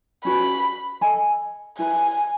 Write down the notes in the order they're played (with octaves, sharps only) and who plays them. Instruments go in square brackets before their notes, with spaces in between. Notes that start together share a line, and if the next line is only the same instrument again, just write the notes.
[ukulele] C#4 F#4 B4 [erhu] B5
[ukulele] A4 D#5 G#5 B5
[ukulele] E4 B4 E5 B5 [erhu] G#5